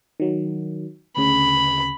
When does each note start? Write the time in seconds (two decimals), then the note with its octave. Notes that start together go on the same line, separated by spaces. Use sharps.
0.20 D#3 F#3
1.17 D2 C#3 B5